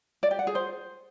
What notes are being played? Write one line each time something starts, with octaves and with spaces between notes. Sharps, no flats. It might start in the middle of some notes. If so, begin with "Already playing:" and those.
D5
G4
F#5
G#4
C5